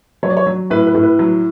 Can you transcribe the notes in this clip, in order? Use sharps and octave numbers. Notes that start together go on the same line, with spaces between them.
F#3 C#5
D5
C#5
F#3
A2 B4
B4
A2
B4
F#3